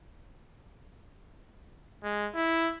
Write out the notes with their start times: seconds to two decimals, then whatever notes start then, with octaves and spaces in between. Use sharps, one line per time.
2.04 G#3
2.35 E4